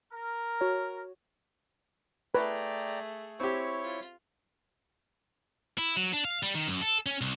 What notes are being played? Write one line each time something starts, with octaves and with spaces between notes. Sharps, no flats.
A#4
F#4 C#5
A3 G#4 B4 D5 G5 A#5
C4 E4 G4 C#5 C#6
F4
E4
F#3
D4
F5
G3
D#3
F#2
A4
C#4
C2